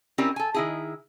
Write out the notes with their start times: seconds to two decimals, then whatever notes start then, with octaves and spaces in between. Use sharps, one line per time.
0.18 C4 C#4 E4 G4 A#4 D5
0.36 A4 G#5
0.54 D#3 E4 G#4